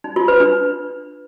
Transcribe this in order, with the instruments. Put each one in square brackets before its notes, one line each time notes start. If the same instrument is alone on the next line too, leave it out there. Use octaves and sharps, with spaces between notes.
[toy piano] D#4
F4
B4
D4